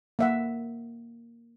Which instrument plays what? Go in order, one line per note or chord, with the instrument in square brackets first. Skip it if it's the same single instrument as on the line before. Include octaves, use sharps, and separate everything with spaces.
[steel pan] A#3 E5 F#5